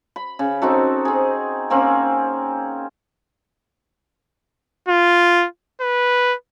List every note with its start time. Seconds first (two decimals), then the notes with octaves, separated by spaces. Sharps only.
0.16 B5
0.39 C#3
0.62 C4 D#4 F#4 A4
1.05 C4 G#4
1.70 A#3 C4 C#4
4.88 F4
5.81 B4